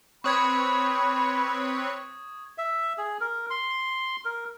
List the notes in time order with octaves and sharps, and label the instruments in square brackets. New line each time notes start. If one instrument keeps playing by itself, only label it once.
[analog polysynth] C4 B4 C#5 [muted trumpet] B5 [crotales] C#6 D#6 G#6
[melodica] E5
G#4
A#4
C6
A#4